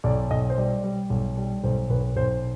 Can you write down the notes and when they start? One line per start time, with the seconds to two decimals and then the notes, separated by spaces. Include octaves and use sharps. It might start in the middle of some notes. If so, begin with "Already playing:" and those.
0.04 B1 D5
0.31 B1 D#5
0.50 C5
0.58 G3 D5
0.84 G3
1.10 B1
1.37 G3
1.64 B1 C5
1.90 B1 B4
2.16 B1 C5